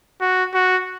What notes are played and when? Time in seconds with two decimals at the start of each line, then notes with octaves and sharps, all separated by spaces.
0.21 F#4
0.54 F#4